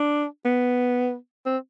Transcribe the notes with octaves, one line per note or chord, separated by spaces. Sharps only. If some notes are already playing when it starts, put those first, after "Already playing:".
Already playing: D4
B3
C4